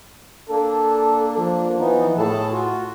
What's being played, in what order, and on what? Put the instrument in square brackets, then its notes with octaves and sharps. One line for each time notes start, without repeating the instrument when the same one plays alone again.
[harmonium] A#3 D4 [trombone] A4
[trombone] F3
[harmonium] E3 B3 D#4
[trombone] A2 [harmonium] G#4 A4 A5
[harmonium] F4 F#4